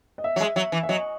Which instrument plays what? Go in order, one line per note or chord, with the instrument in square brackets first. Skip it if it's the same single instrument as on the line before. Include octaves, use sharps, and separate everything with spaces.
[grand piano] D#5
E5
[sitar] F#3
G#3
[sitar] F#3 [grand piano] E5
[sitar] E3
[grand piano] E5
[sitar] F#3 [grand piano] D#5